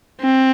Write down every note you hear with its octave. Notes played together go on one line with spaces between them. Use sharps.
C4